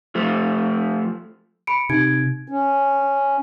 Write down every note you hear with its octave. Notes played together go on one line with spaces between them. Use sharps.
F3 A3
B5 C#7 D7
C3 D#4 G#6 D7
C#4